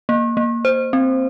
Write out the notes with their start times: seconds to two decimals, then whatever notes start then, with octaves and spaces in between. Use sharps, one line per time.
0.09 A#3
0.37 A#3
0.65 C5
0.93 C4